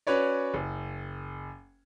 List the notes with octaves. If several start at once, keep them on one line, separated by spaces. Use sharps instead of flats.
C#4 F#4 B4 C#5 D5
F#1